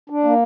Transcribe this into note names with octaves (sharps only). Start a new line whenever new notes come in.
D4
A#3